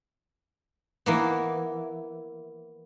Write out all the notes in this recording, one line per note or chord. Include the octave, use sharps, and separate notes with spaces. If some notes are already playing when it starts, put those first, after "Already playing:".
E3 A#3 B3